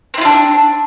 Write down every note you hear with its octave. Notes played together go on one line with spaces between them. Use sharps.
C4 D4 E4 F4